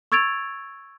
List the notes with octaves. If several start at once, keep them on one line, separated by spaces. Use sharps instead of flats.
C#6 E6 G#6 A6 D7 F7